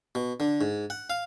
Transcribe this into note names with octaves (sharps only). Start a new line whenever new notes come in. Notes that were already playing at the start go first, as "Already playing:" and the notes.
B2
D3
G#2
F#5
F5